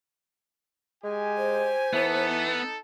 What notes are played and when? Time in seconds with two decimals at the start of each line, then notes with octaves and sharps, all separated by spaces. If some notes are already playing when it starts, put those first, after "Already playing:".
1.04 G#3 G4 G#5
1.37 C5
1.93 E3 B3 D#4 A4